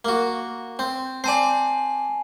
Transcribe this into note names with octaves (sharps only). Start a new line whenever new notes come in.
A#3 F#4
C4
C4 D5 G#5 A5 C7